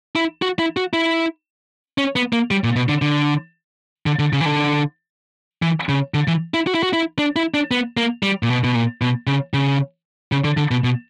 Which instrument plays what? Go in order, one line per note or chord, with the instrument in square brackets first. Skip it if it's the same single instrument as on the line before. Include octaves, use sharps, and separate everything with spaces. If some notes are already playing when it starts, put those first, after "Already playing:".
[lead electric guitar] E4
F#4
E4
F#4
E4
C#4
B3
A#3
G3
A#2
B2
D3
D3
D3
D3
C#3
E3
D3
E3
C#3
D3
E3
E4
F#4
E4
F#4
E4
D4
E4
D4
B3
A#3
G3
A#2
B2
B2
A#2
B2
C#3
C#3
C#3
D3
D3
B2
B2